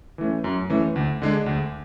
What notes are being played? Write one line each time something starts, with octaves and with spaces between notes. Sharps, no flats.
E3 A3 C#4
F#2
E3 A3 C#4
D2
D3 G#3 D4
D2